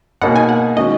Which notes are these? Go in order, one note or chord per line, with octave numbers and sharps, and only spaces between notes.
B2 A#3 D#4 G#4 F#5
G#5
F#5
D#3 G#3 C#4 F#4 D#5